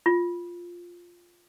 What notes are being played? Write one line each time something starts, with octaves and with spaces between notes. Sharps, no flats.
F4